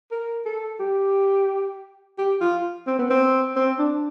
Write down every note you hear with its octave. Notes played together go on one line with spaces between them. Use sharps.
A#4
A4
G4
G4
F4
C4
B3
C4
C4
D4